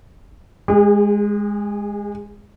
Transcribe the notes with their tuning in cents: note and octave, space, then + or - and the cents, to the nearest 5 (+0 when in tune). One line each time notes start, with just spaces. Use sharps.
G#3 -5 G#4 -45